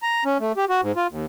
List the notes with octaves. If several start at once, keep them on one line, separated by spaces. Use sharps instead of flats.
A#5
C#4
A3
G4
F#4
G#2
F4
D#2